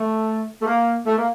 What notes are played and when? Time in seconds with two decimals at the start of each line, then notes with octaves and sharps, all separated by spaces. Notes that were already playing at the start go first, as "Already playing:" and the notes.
Already playing: A3
0.61 A3
0.66 A#3
1.06 A3
1.17 A#3